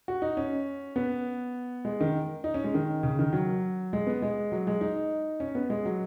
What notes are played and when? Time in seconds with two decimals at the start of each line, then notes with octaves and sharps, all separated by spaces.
0.08 F#4
0.22 D#4
0.37 C#4
0.96 B3
1.85 G#3
2.01 D#3
2.44 D#4
2.54 C#4
2.64 G#3
2.74 D#3
3.03 C#3
3.19 D#3
3.33 F#3
3.93 G#3
4.07 B3
4.22 G#3
4.52 F#3
4.67 G#3
4.81 D#4
5.40 C#4
5.55 B3
5.70 G#3
5.85 F#3